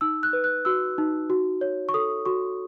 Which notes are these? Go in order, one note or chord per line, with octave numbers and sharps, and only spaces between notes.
D#4 E6
F#6
B4
F#6
F#4 E6
D#4
F#4
C#5
C#6
A4 D#6
F#4 C#6